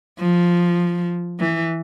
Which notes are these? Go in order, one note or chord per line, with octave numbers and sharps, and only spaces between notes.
F3
E3